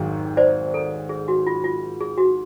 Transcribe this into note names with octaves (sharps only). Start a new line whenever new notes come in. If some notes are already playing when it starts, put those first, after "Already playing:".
Already playing: G#1 G#2 D#3 F#3
C5 D5
A4
G#4
F#4
F4
F4
G#4
F#4